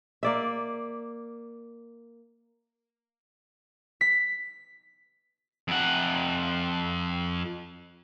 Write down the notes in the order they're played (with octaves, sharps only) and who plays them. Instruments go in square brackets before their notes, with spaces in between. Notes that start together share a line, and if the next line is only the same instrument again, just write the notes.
[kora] A#3 D5 E5
[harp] B6
[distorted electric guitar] F2 F#5